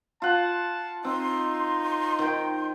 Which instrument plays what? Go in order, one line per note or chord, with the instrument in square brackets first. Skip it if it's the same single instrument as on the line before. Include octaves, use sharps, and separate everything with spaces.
[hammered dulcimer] F4 F#5 [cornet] A5
[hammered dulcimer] C4 [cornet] D#4 [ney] C6
[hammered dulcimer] D#3 G5